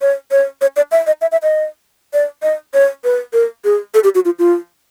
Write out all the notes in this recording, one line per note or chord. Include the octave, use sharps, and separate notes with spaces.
C#5
C#5
C#5
D5
E5
D#5
E5
E5
D#5
D5
D#5
C#5
B4
A#4
G#4
A4
G4
F#4
F4
F4